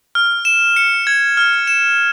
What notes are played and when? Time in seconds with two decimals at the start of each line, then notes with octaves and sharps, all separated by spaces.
0.15 F6
0.45 E7
0.76 C#7
1.07 G#6
1.37 F6
1.67 E7